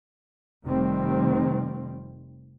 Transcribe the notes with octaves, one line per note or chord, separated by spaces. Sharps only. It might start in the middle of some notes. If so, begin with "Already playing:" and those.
F1 C3 D#3 G3 C4